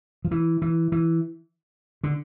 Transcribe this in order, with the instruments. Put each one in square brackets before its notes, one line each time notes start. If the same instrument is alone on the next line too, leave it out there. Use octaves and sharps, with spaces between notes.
[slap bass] F3
E3
E3
E3
D3